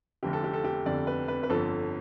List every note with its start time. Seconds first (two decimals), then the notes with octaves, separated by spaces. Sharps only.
0.23 F1 F2 D3 G4
0.33 A4
0.44 G4
0.53 A4
0.64 G4
0.86 F1 F2 D3 D5
1.07 B4
1.28 B4
1.43 B4
1.49 G1 F2 D3 F3 A4